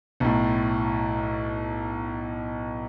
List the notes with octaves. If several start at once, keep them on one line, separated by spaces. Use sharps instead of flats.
B1 A2